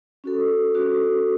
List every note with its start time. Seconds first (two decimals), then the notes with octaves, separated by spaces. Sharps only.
0.24 C#4 F#4 A4
0.74 C#4 F#4 A4